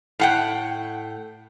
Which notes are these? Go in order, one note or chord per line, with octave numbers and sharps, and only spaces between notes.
A2 F#5 G5